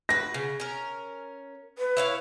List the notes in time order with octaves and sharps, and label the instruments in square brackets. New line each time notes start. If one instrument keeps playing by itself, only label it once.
[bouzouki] F#4 B4 [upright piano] A#6
[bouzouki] C#3
C#4 A#4
[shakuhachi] B4
[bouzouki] E4 C#5 F5